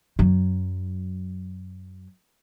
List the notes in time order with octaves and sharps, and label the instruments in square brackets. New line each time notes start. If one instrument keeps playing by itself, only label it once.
[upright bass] F#2 F#3